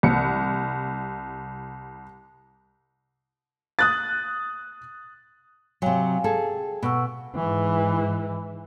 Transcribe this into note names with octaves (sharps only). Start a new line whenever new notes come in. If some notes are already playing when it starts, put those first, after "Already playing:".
C2 C#7
D#6 F#6 A6
C3 F#3 F5 G5 G#5
G#4 A4
B2 F#5 C#6 E6
G#2 E3